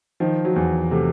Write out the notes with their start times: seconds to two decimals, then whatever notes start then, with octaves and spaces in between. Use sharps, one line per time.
0.20 D#3 F3
0.45 F#3
0.56 E2
0.91 C3 A3